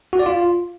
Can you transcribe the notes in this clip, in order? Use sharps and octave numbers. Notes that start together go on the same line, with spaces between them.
F#4
D5
F4